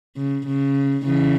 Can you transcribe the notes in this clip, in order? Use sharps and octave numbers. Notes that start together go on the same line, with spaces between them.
C#3
C#3
C#3 E3